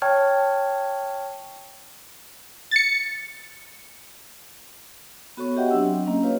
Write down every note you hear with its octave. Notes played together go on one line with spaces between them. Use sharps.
C#5 G5 A5 C#6 F6 G#6
A6 C#7
B3 F#4 A4 C#5 C#6
F#4 G4 D#5 E5 F#5 G5
F#3 C4 D4 E6
A#3 C#4 D#5
F4 G4 B4 C#5 F5